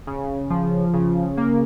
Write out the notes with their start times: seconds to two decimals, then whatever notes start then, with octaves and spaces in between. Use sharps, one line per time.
0.07 C#3
0.50 F3
0.94 C#3
1.37 A#3